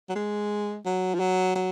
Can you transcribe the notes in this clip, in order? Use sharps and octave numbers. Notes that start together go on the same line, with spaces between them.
F#3
G#3
F#3
F3
F#3
F#3